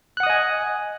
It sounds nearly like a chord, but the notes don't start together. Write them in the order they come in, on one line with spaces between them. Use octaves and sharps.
F#6 F#5 D#6 D#5 G#5